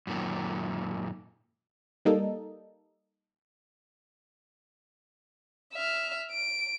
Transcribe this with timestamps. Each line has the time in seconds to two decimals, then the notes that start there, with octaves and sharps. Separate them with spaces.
0.07 F#2 A#2 D#3
2.05 G3 A#3 D#4 A4
5.73 E5 F6
6.31 D7